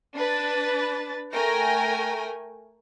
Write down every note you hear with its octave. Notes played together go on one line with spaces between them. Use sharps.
D4 B4 A6
A3 A#4 G5 G#5 A#6